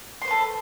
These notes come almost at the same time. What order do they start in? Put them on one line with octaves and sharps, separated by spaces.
C6 C5 B4 A4